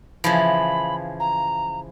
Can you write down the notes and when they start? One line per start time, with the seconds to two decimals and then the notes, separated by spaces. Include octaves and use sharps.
0.24 C#3 E3 F3 B5
1.20 A#5